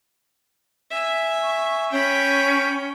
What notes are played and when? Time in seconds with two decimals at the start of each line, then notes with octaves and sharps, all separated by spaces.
0.91 E5 G#5
1.42 C#6
1.91 C#4 G5 B5